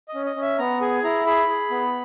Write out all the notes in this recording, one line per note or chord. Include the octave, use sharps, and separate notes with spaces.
D#5
C#4
D#5
C#4
E5
B3 A#5
G#4 G#5
E4 A#5
G#4 B5
G#4
B3